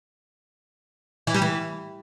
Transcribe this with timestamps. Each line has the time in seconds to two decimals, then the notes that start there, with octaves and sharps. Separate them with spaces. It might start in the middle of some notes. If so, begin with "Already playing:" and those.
1.27 E3
1.34 G3
1.42 E3